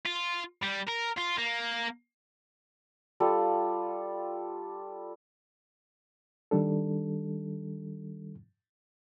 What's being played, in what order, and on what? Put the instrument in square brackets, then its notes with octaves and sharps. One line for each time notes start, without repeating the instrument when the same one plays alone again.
[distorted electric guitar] F4
G3
A#4
F4
A#3
[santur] G3 F4 A4
[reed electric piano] D#3 G3 D4 A4